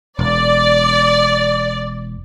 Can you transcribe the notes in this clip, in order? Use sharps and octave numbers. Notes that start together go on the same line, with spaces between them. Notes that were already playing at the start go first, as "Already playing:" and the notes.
E1 D5